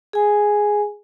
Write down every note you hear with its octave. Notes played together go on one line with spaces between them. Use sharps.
G#4 G#5